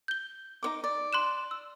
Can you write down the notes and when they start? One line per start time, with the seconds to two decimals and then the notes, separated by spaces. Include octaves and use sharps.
0.08 G6 G7
0.63 D#4 C#5 D6
0.84 D5
1.13 C6 F#6 E7
1.51 E6